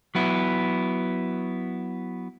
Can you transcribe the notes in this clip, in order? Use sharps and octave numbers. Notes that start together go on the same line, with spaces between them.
F#3 B3 E4